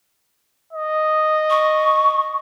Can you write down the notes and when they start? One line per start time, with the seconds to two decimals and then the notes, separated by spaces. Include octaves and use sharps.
0.73 D#5
1.50 C#6